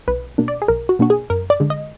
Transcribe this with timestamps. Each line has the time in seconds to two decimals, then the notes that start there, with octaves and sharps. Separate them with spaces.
0.07 B1 B4
0.38 B2 A#3 D4
0.48 D5
0.62 G#4
0.68 B1 A#4
0.89 F#4
0.99 B2 A#3 D4 F#4
1.10 G#4
1.30 F#2 A#4
1.50 D5
1.60 D3 G#3
1.70 D#5